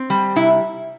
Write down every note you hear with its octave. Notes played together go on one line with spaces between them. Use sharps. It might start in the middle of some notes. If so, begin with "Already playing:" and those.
Already playing: C4
G3
C3 E4